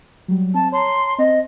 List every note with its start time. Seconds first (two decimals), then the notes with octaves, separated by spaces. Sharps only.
0.28 F#3 G3
0.54 C4 A5
0.72 C#5 A5 A#5 C6
1.18 C4 D#5